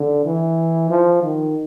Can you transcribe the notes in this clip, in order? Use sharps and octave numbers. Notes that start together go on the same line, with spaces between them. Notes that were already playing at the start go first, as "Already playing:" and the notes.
Already playing: D3
E3
F3
D#3